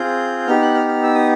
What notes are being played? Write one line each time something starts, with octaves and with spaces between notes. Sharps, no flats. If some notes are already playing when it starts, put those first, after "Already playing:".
Already playing: C4 F4 G#4 G6
B3 D#4 G4 F6
F#6
F6
F6
E6
D#6